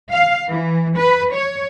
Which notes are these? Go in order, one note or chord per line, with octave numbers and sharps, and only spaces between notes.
F5
E3
B4
C#5